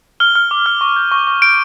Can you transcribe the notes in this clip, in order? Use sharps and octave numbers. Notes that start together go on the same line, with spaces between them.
F6 G7
F6
D6
F6
C#6
G6
C#6
C#6
G6 D7